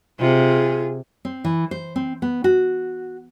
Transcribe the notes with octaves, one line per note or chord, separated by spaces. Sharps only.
C3 F4 G#4
C4
E3
C5
C4
B3
F#4